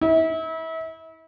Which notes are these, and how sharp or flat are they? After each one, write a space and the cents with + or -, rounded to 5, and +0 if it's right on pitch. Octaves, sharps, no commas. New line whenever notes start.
E4 -35